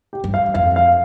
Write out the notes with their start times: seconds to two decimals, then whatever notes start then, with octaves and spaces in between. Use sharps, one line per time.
0.13 G4
0.24 G2
0.34 F5
0.54 F2 F5
0.76 F5